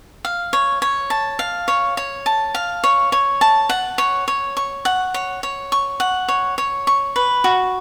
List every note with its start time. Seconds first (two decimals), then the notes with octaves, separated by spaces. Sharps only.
0.25 F5
0.53 C#5
0.82 C#5
1.10 A5
1.39 F5
1.68 C#5
1.97 C#5
2.26 A5
2.54 F5
2.84 C#5
3.12 C#5
3.41 A5
3.69 F#5
3.98 C#5
4.28 C#5
4.57 C#6
4.85 F#5
5.14 C#5
5.43 C#5
5.72 C#6
6.00 F#5
6.28 C#5
6.58 C#5
6.87 C#6
7.16 B4
7.44 F#4